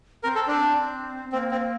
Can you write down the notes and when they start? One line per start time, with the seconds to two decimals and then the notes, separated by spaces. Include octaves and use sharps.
0.23 C4 A#4
0.35 A4
0.48 D4
0.59 C4
1.32 A#3 C4
1.51 C4